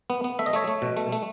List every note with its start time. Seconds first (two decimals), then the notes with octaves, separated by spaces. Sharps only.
0.10 B3
0.24 B3
0.39 A3 E5
0.46 D#5
0.53 A3 C#5 E5
0.68 A3
0.82 B2
0.97 A3
1.12 A3